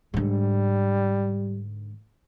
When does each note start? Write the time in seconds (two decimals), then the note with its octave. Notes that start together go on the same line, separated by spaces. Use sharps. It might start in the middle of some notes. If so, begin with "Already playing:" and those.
0.14 G#2 D3 G3